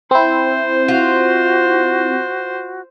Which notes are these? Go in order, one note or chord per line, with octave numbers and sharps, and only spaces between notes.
C4 E4 C5
F4 F#4